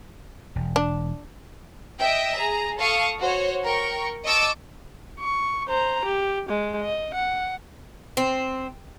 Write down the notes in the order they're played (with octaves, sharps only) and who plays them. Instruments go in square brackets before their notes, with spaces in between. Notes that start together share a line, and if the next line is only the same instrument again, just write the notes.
[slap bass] E1
[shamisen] D4
[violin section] D#5 E5 G5
G#4 A#5
A4 F5 C#6 D#6
F#4 C5 C#5
A#4 G5 C#6
D#5 A5 C#6 D6 E6 A6
[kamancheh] C#6
C5 A#5
G4
G#3
D#5
F#5
[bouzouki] C4